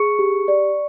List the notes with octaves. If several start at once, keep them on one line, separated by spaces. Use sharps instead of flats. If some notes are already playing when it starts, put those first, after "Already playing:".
Already playing: G#4 C#6 C#7
G4
D5